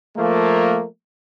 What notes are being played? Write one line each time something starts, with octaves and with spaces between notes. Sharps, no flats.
F3 A3 A#3